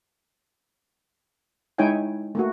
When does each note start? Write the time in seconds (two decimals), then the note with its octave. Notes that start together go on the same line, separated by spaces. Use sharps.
1.78 G#3 D#4 E4 C#5 G5 G#5
2.35 A3 A#3 F#4